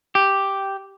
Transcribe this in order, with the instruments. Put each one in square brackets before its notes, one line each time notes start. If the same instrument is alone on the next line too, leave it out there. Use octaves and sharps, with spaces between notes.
[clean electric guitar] G4